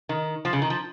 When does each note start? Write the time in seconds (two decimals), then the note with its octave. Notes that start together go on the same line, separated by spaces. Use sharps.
0.09 D#3
0.45 F3
0.53 C#3
0.62 D#3
0.70 F3